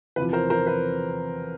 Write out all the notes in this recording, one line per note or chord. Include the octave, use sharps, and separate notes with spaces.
E2 C3 F3 B4
A#4 C5
A#4 C5
B4